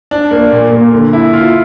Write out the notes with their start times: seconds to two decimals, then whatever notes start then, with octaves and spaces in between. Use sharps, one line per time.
0.11 D4
0.31 A#3
0.52 A#2
0.72 A#2
0.92 D3
1.13 E4
1.33 F4